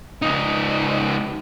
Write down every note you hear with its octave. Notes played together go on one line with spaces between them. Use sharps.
C#2 D#4